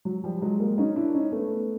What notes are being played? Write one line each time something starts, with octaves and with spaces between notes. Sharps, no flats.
F#3
F3 G3
F#3 G#3
G#3 A#3
C#4 D#4
D4 E4
C#4 D#4
A3 B3